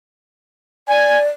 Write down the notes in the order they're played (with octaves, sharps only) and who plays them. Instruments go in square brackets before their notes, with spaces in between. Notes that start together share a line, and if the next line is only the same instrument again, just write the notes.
[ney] D5 [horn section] G#5